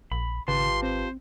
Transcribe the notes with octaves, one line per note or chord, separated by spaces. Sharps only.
A#1 B5
G#1 C#3 F4 G4 B4 A5 C6
C4 C5